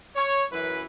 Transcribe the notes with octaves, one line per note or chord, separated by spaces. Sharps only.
C#5
F#2 E3 B4